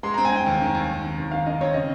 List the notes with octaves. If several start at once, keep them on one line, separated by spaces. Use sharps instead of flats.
G#3 C6
C4 A#5
G#5
C4 G5
D#2
D#3
D#2
C4
D#3
D#2
D#3 F5
D#3 D#5
C4 C#5
C#3 D#5